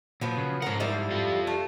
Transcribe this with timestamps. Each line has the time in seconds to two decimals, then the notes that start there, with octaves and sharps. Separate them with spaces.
0.21 A#2 F3 F#3 B3
0.37 C#3
0.62 G#2 F3 A#4 F#5
0.80 F3 G3 E4
1.11 F4 A4
1.47 A3